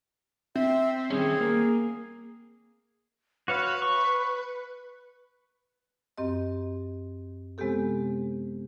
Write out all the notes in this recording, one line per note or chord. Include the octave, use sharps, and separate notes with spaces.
C4 E5
D#3 G3 C#4 G#4
A#3
F#4 B4 C#5 F5
C#6
F#2 C4 G4 D#5
C3 G#3 B3 C4 G4 A4